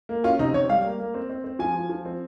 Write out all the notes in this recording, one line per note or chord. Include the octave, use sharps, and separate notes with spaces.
A#3
C#4 F4
C3 D#4
C3 C#5
G3 F5
A#3
A#3
C4
C4
C4
F3 G#5
F3
F3
C4